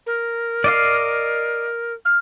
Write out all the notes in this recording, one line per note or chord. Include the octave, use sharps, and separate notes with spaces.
A#4
D5 D#5 F5
F6